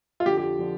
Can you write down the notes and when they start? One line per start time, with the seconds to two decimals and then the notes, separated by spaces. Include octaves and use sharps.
0.20 F4
0.26 F2 D3 F3 G4
0.38 G4
0.59 D3 F3